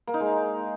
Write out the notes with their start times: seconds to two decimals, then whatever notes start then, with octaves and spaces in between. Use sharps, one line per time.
0.07 A#3
0.14 D#4
0.20 G#3